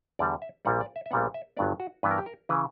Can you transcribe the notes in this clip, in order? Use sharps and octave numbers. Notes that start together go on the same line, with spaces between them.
E2 D3 G3 D5
E5
A#1 A#2 G3 F#5
D5
E5
E5
A#1 A#2 G3 B3 F#5
E5
G1 G2 F#3 B3 D5
F#4
G2 E3 B3 B4
A#4
G4
A#4
C#3 E3 B4